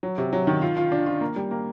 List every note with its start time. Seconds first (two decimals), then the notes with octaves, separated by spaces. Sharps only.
0.03 F#3
0.18 C3
0.33 F#3
0.47 D#3
0.62 F4
0.77 F4
0.92 D4
1.06 F4
1.21 A#3
1.36 G3
1.51 A#3